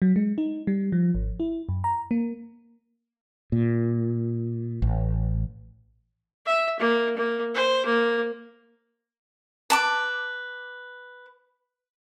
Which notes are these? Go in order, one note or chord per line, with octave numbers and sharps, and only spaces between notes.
F#3
G#3
D#4
G3
F3
G#1
E4
F#2
A#5
A#3
A#2
A1
E5
A#3
A#3
C5
A#3
B4 A5 D6